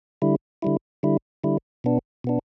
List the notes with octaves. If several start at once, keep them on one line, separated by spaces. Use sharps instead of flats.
D3 G3 E4
D3 G3 E4
D3 G3 E4
D3 G3 E4
B2 B3 D4
B2 B3 D4